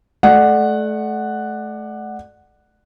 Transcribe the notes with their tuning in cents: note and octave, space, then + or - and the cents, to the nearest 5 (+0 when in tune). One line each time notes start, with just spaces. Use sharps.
A3 -30 D5 +20 F#5 +0